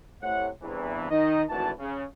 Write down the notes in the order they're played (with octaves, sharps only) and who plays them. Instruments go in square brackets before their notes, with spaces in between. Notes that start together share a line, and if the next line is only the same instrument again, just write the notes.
[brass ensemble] A2 C3 C#5 F#5
E2 G2 C3 E3
D#3 D#4 D#5
G#1 D2 E3 F#4 A5
C#3